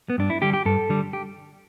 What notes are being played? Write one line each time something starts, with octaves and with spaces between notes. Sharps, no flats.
B3
G2 D4
E4
D3 G3 G4
G4
G2 A4
D3 G3
G4